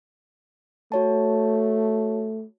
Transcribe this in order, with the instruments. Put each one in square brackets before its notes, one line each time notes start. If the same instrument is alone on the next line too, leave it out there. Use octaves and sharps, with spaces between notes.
[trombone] A3 [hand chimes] F#4 C#5 A5